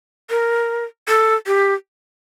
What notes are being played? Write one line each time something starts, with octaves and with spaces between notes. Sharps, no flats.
A#4
A4
G4